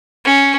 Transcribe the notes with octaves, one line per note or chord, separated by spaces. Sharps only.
C#4